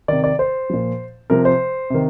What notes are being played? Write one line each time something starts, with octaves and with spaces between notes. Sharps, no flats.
C3 D#3 D5
D5
C5
A#2 F3
C3 F3 A#4
C5
C3 D#3